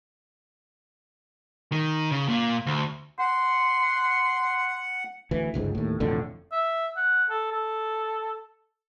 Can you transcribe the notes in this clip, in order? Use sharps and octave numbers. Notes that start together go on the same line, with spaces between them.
D#3
C#3
A#2
D2
F#5 C6
D2 E3
G1 C#2 G#2
D#2 A2
E1 F2 A2 D3
E5
F#5
A4
A4